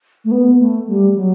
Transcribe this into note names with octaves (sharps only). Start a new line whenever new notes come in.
A3
B3
A3
G3
F#3